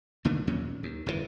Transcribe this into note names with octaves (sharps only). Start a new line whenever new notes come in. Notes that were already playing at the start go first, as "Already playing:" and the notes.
B1 D3 A3 A#3
D#2 A#2 F#3 C#4
D#2
G1 F2 A2 E3